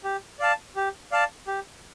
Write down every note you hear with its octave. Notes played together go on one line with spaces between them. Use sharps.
G4
D5 F5 A5
G4
D5 F5 A5
G4